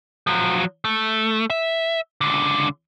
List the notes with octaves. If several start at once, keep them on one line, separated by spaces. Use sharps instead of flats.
F3 F#3
A3
E5
C#2 D3